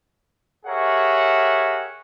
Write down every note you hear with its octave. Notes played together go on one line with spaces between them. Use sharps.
G4 G#4 A#4 C#5 E5 F#5